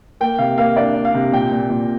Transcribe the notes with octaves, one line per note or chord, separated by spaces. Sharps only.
A#3 G5
C3 F5
A#3 F5
D4 D5
D4
F5
C3
A#2 G5
A#2
A#2